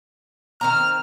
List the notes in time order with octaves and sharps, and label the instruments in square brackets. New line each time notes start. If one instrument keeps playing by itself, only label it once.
[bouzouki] D#3 C4 A#5 [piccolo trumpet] F6